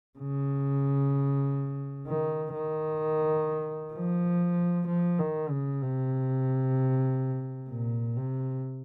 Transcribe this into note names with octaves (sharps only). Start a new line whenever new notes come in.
C#3
D#3
D#3
F3
F3
D#3
C#3
C3
A#2
C3